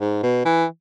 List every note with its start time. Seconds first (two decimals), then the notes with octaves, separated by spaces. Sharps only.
0.01 G#2
0.23 B2
0.45 E3